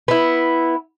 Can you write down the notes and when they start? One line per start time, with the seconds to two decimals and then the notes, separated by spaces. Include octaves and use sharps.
0.08 B3 E4